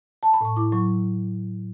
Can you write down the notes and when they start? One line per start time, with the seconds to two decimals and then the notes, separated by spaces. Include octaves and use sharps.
0.23 A5
0.34 B5
0.41 A2 C#6
0.56 E4 D6
0.72 F#3 C#6